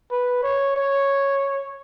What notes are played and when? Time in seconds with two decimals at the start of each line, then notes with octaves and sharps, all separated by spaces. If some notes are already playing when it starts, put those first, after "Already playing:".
0.11 B4
0.43 C#5
0.76 C#5